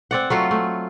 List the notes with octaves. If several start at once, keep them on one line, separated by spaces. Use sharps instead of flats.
C4 D5 F#5
F#3 A3 F4
A3